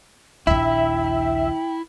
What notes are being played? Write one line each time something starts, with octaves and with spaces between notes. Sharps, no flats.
A#1 D#2 E4 E5 G5